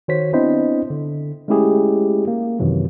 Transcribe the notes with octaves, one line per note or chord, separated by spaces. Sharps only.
D#3 F#4 C5 C#5 B6
B3 C4 D4 E4 C5 D#5
D3
G#3 A3 C#4 E4 G4 G#4
A#3
F#2 C3 D#3 E3 F#3